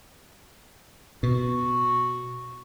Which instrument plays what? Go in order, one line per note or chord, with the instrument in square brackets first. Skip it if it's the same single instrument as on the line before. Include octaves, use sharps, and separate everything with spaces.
[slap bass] B2 [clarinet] F#4